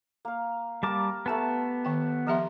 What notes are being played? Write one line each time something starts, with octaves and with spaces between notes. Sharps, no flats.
A#3 F5
G3 A#3 G4 A#4 A5 D6
A3 B3 G4 B4 A5
D#3 G5
F3 G4 A#4 E5 A#5 C6